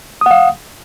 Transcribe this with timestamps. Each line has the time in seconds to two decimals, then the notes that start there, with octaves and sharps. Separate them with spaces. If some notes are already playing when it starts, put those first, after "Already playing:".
0.21 D#6
0.26 F#5
0.31 F5